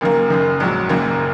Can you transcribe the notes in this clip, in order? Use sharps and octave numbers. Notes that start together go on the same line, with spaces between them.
F#1 F#2 D#3 A#3
F#1 F#2 D#3
A#1 G#2 F#3
F#1 F#2 D#3 A#3